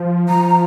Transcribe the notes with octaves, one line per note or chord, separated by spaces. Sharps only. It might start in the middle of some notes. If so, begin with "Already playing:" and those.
Already playing: F3
F3 A#5